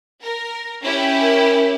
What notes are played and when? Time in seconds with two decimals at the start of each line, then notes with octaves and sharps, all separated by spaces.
0.21 A#4
0.82 C#4 E4 G4
1.21 A#4